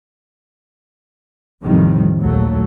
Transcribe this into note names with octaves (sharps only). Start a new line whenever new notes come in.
A1 F2 A2 C3 D#3 G3
A#1 D#2 F#3 A3